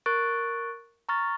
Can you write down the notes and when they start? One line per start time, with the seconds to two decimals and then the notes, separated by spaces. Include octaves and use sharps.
0.06 A#4 C#6 F#6 A6 D7
1.09 A#5 C#6 F6 A6